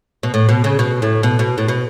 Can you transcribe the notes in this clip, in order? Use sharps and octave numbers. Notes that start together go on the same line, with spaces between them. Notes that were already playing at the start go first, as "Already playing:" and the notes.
B2
A2
B2
C#3
B2
A2
B2
B2
A2
B2